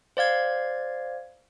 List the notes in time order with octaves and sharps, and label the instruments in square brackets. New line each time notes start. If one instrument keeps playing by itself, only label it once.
[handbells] C5 D5 F5 G#6